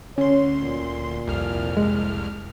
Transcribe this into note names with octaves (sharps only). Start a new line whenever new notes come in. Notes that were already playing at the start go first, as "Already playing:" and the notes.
D2 C#4 C#5 C6
A#2
C2 F2 F6
G#3